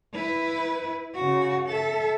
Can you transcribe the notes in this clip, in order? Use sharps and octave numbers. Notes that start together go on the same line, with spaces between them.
E4 B4
C#3 F#4
A4 E5